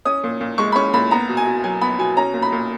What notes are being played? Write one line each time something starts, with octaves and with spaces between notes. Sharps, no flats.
C#4 D#6
A#2
A#2
G#3 C#6
B5
C#4 C#6
A#2 B5
B3 A#5
B2
G#5
B2
F#3 G#5
B3 B5
B2 G#5
C#4 A#5
A#2
B5
A#2